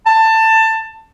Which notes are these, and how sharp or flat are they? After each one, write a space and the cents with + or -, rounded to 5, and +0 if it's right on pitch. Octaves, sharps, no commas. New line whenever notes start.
A5 +20